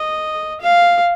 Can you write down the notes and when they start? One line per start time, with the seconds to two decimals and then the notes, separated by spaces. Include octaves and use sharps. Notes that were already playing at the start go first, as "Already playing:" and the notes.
Already playing: D#5
0.61 F5